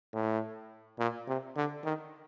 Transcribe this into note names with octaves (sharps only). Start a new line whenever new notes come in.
A2
A#2
C3
D3
D#3